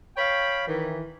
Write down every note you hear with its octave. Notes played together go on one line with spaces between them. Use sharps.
C#5 F5 G5 B5
D#3 E3